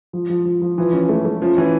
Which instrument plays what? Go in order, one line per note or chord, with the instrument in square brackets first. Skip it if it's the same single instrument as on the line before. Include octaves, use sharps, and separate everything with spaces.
[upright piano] F3
F3
F3
F3
[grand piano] E3 [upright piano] F3
[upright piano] C#4
A3
A3
[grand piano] F3 [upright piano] C#4
[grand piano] E3 [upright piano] C#4